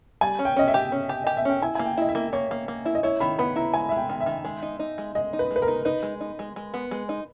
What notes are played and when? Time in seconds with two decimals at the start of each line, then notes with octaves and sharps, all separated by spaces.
0.21 G3 G#5
0.39 C#4
0.45 G5
0.56 C#4 D#5
0.68 E5
0.74 G4
0.92 C#4
1.09 G4
1.24 G4 D#5
1.37 E5
1.45 C#4 G5
1.62 E4 G#5
1.75 A#3 G#5
1.86 G5
1.97 E4 D#5
2.09 E5
2.15 A#3
2.33 A#3 C#5
2.51 A#3
2.68 A#3
2.85 E4
2.95 D#5
3.03 E4 C#5
3.20 D#3 B5
3.38 B3 B5
3.56 E4 A#5
3.74 G#3 G#5
3.89 G#3 E5
3.97 G5
4.09 D#3
4.20 E5
4.26 D#3
4.45 G#3
4.62 D#4
4.79 D#4
4.98 G#3
5.15 G#3 D#5
5.33 D#4
5.39 B4
5.51 G#3
5.56 B4
5.62 A#4
5.68 D#4
5.85 D#4 B4
6.03 G#3
6.21 D#4
6.39 G#3
6.56 G#3
6.74 B3
6.91 G#3
7.09 D#4